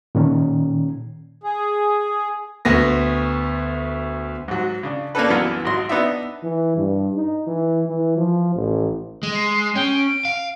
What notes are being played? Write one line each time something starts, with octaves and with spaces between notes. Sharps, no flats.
A#2 D#3 C#4
G#4
D2 B3 A#6
G#2 F#3
C#3 D4
A#3 C#4 D4 A4 B4
C2 F#2 E3 B3 B4 F6
G#1 F#3 D#5 C6
B3 D4 D#4 E5
E3
G2
D#4
E3
E3
F3
A1
G#3
C7
C#4 G5
D7
F5